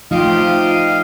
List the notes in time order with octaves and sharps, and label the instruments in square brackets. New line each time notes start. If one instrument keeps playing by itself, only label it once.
[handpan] F3 A3 D#4 [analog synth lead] F4 [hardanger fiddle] G4 [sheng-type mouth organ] D#5 F5